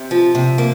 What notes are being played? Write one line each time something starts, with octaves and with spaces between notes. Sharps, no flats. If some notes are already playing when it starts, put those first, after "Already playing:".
Already playing: C3
F3
C3
A#3